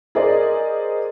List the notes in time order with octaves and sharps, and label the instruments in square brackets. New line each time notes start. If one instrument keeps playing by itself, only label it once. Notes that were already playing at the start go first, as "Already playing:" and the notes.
[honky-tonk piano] G#4 A#4 C5 D5 D#5